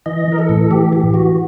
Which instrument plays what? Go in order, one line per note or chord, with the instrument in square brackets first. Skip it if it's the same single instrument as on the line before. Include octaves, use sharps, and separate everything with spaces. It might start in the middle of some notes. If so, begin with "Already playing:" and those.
[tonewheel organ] E3 D#5
E3 A#4
A4
A2
E3 G4
E3 G4
E3 F#4